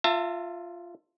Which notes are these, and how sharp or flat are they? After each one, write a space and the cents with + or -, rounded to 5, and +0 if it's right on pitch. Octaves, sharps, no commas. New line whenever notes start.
F4 +0 E5 +25 A5 +40